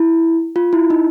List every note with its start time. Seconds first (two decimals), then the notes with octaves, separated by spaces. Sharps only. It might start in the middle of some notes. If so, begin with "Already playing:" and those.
Already playing: E4
0.56 F4
0.73 E4
0.90 D#4